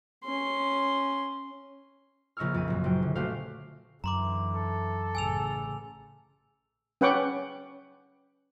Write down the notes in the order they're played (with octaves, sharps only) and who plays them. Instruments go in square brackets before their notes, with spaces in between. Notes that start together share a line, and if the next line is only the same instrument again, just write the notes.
[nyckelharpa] C#4 C6
[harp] A#1 C#3 D#5 C#6 E6 F6
F2 D#7
F#2 A#2
F#1 F#3 G5
D3
A3 C#4 F#4 G4 C5 F5
[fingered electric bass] F#2 [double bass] D3 E3 [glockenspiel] A#5 C6 D6
[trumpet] A4
[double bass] A1 C#3 [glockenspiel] G#5 E6 F7
[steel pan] C#4 B4 F#5 G5 C#6 D6